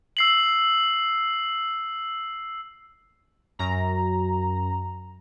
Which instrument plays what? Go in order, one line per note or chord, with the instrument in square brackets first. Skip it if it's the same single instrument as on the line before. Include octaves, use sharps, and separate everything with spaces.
[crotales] E6 C7 F#7
[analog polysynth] F#2 A#5